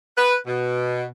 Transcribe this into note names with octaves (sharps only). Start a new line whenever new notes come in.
B4
B2